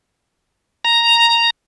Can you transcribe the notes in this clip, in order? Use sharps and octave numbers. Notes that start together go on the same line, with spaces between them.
A#5